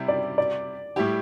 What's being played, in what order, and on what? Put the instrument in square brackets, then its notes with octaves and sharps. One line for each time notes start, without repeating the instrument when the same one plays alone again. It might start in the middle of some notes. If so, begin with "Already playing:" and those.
Already playing: [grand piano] C3 G3 E4 G4
[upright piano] D5
D5
[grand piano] A2 G3 E4 G4